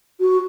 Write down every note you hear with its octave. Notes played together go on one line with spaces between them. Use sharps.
F#4